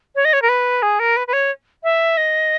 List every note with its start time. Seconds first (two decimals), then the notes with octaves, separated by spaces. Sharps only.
0.15 C#5
0.25 D#5
0.33 C#5
0.42 A#4
0.49 B4
0.82 G#4
0.99 A#4
1.17 B4
1.27 B4
1.33 C#5
1.84 E5
2.17 D#5